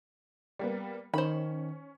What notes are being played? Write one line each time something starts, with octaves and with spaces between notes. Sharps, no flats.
G3 A#3 B3
D#3 C#4 C5 B5